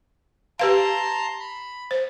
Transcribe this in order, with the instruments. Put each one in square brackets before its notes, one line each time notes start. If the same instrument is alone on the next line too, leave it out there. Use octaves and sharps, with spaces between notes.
[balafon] G4 B4 F5 [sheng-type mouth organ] A5 A#5 C6
[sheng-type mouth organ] B5
[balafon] C5